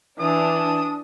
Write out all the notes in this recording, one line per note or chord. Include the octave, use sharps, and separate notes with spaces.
E3 D4 D#6